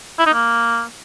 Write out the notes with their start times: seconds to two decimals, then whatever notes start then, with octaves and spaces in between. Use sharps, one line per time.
0.19 E4
0.26 D#4
0.34 A#3